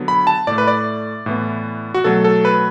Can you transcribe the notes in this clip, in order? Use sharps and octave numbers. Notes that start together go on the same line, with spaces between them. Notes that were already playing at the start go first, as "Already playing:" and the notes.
Already playing: D3 F#3 B3
B5
A5
A2 A3 D5
B4
D5
A2 E3 B3
F#4
B2 F#3 A3 A4
A4
B4